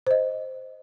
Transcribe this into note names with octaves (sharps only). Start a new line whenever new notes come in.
C5 D#5